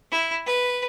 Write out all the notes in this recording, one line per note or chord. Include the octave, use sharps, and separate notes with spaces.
E4
B4